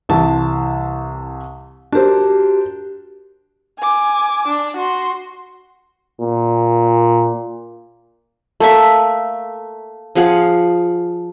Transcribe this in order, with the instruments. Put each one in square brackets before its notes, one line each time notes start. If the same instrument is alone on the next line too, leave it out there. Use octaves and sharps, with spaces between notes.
[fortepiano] C2 E3 A5
[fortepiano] D4 A#4 C5 [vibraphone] F#4 G4
[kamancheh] G#5 D6
D4
F#4 C6
[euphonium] A#2
[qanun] A3 A#3 E5
F3 G#4 F5 F#5